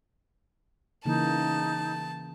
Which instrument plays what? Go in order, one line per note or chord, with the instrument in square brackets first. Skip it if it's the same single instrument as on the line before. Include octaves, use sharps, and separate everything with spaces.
[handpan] C#3 E3 A#3 [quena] D#4 [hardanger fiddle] A5